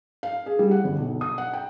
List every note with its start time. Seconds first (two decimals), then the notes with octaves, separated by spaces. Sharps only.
0.23 F5
0.46 G#4
0.59 G3
0.71 F#5
0.84 G1
0.98 B1
1.21 D#6
1.38 F#5
1.53 G5